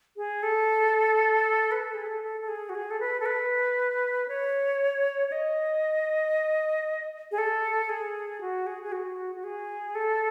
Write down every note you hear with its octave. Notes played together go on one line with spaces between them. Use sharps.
G#4
A4
B4
A4
G#4
A4
A4
A4
G#4
F#4
G#4
A4
B4
A4
B4
C#5
C#5
D#5
G#4
A4
G#4
F#4
G#4
G#4
F#4
F#4
G#4
A4